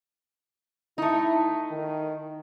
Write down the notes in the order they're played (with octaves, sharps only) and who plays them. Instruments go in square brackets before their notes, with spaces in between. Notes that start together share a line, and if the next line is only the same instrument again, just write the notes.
[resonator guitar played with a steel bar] A3 D#4 [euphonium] E4
[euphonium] D#3